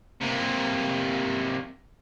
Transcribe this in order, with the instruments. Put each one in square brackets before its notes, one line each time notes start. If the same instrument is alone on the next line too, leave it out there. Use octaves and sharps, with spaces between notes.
[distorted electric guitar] C3 A#3